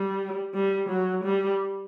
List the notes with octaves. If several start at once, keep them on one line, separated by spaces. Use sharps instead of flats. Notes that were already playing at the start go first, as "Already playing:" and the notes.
Already playing: G3
G3
F#3
G3